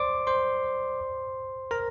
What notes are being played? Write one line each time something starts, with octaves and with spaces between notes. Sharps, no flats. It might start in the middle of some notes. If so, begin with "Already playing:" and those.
Already playing: C5 D5 C6 D6
C5 C6
A#4 A#5